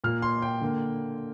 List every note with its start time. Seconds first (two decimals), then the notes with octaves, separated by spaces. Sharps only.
0.04 A#2 A#3 F6
0.22 C6
0.42 G5
0.61 D3 A#3